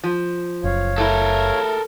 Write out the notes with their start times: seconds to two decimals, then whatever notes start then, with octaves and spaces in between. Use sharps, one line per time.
0.04 F3
0.64 F#1 C#5 F5
0.98 A3 E4 A4 A#4